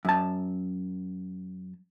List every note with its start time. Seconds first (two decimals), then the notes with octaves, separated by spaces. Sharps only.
0.05 F#2 A5